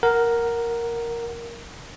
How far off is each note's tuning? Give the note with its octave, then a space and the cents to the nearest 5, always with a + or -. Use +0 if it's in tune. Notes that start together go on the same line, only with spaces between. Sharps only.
A#4 +0 F#5 +0